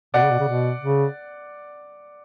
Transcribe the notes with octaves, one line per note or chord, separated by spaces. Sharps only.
B2 D5 F#5
C#3
B2
C#3
B2
C#3